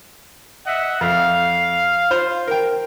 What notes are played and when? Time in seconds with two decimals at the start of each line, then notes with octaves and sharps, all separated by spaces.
0.66 D#5 E5 F#5
1.01 F2 F5
2.11 F4 C5
2.48 A#4 G5